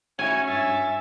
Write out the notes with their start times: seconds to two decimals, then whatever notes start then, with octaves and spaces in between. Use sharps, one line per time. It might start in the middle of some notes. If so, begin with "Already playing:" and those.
0.19 C#4 E4 F#4 G#5 G#6
0.47 G2 E5 A6